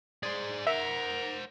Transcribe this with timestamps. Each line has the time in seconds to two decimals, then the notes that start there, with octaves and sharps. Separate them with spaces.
0.23 G#4 C5 D5
0.67 A#4 C5 E5 F#5